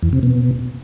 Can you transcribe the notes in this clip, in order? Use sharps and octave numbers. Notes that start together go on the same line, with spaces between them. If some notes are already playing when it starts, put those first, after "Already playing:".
E2
C3
B2